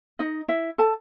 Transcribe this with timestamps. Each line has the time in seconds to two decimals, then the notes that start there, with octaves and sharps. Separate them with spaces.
0.19 D#4 D#5
0.48 E4 E5
0.78 A4 A5